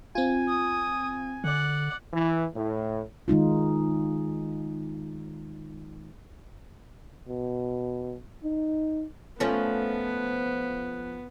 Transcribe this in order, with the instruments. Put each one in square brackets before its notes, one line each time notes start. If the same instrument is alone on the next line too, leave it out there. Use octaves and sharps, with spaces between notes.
[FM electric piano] C4 F4 [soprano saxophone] G#5
[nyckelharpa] D#6
[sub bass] D3 [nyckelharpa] D5 F#5
[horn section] E3
A2
[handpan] D#3 G#3 D#4 F4
[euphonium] B2
D#4
[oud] F3 A3 C#4 [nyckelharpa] B3